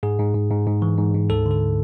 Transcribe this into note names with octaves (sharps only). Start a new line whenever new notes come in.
G#2 G#4
G#2
G#2
G#2
G#2
E3
G#2
G#2
D2 A4
D3
A4